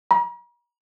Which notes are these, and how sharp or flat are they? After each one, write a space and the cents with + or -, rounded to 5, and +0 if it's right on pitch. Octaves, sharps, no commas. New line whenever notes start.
A#5 +45